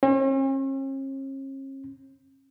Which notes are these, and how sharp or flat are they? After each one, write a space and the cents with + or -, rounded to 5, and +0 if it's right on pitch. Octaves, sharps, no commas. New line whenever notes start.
C#4 -45